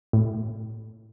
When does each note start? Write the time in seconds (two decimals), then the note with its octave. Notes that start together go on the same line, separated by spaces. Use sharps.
0.13 A2